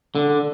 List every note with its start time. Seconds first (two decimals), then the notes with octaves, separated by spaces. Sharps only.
0.15 D3